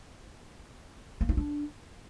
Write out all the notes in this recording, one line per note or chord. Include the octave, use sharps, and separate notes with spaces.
A#3
D#4
D4